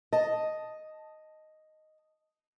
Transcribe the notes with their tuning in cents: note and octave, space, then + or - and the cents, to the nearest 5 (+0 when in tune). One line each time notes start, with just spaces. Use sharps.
D#5 +0 A5 +0